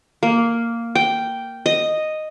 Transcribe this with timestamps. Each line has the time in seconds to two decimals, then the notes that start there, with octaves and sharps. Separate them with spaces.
0.23 A#3
0.95 G5
1.66 D#5